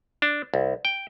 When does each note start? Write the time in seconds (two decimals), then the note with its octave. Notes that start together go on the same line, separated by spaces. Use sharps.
0.22 D4
0.54 C2
0.85 G5